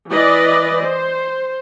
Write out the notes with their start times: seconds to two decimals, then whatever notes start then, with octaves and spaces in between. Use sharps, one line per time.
0.10 E3 B4 D5 D#5
0.84 C5